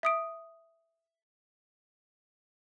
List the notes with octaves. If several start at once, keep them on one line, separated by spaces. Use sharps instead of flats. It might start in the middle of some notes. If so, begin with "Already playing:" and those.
E5 D#6 D7